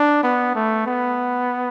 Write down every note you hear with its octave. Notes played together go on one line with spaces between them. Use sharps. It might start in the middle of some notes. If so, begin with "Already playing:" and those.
Already playing: D4
B3
A3
B3